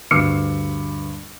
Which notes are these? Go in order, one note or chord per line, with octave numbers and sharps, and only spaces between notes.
D2 G2 D6 E6 F6 C#7